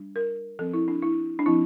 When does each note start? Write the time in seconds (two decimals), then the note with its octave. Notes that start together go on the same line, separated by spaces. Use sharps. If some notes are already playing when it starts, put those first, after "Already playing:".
Already playing: G3 D4
0.16 A#4
0.59 F3 C4 A4
0.74 E4
0.88 D4
1.03 E4
1.39 D4
1.46 F3 C4 E4